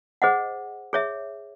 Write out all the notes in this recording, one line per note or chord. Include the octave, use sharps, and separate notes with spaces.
G#4 C5 D#5 F#5
G#4 C#5 E5